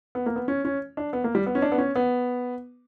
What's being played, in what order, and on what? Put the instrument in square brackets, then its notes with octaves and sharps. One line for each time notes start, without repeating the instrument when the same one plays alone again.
[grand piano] B3
A#3
B3
C#4
C#4
D4
B3
A#3
G3
B3
C#4
D4
B3
C#4
B3